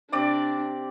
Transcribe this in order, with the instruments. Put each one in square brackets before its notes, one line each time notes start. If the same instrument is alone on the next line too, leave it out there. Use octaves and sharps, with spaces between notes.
[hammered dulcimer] C3 D5 D6 [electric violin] D4